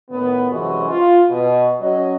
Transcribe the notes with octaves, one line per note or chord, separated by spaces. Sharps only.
A2 D#3 B3
F#2 C3 E3 G#3 F#4
F4
B2
F#3 C#4 F#4 D#5